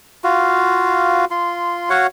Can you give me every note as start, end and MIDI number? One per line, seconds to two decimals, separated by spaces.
0.24 1.25 65
0.24 1.25 66
0.24 1.25 77
1.31 1.89 65
1.31 1.89 84
1.90 2.07 66
1.90 2.07 73
1.90 2.07 77
1.90 2.07 78